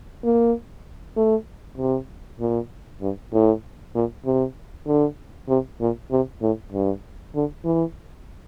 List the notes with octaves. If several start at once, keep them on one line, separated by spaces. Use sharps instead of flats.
A#3
A3
C3
A#2
G2
A2
A#2
C3
D3
C3
A#2
C3
A2
G2
D3
E3